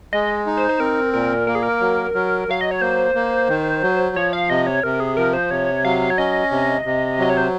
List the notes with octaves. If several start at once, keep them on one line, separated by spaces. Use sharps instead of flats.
G#3 D#5
D#4
C5
C5
C4 A#4
A#2 A#4
A#3 A#4
G#4
A#4
F#3
F#3
F#3 F5
D#5
C#5
A#3 C5
A#3
D#3
F#3
F3 C#5
F5
C3 D#5
C#5
C3 A#4
G#4
F3 A#4
C5
C3 C#5
F#3 F5
C#5
C#4 D#5
C3
C3
F#3 D#5
C#5
C5